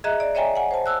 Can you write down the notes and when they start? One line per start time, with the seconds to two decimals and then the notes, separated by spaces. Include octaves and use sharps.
0.04 G#4 D#5 E5 A#5 F#6
0.20 D5
0.35 C#5 D#5 E5 G5 G#5 A#5
0.55 F#5 G#5
0.71 C5 A5
0.86 A5 E6 F#6